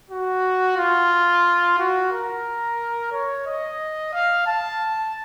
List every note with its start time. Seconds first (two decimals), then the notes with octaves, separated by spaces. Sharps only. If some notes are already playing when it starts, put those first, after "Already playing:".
0.10 F#4
0.77 F4
1.79 F#4
2.12 A#4
3.12 C#5
3.47 D#5
4.13 F5
4.47 A5